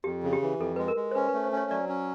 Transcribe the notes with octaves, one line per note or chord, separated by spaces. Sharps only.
F2 G4
C#3
G4
E3
F2 A4
G#3 B4
A#4
G#3
C5
C#4 B4
A3 B4
C5
C#4 C#5
F#3 D5
C#4